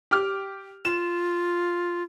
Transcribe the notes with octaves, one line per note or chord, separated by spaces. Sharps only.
G4 D6 F6
F4 E7